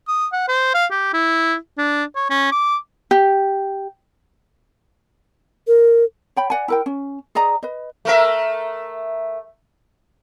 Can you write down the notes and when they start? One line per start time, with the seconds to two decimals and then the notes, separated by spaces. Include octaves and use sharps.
0.08 D#6
0.32 F#5
0.48 C5
0.74 F5
0.91 G4
1.14 E4
1.78 D4
2.16 C#5
2.30 C#4
2.52 D6
3.11 G4
5.67 A#4
6.36 C#5 G5 B5
6.50 D5 F#5 G#5
6.68 E4 A#4 G5
6.86 C#4
7.35 G#4 D5 D#5 A#5
7.63 B4 D#5
8.05 A3 A#4 E5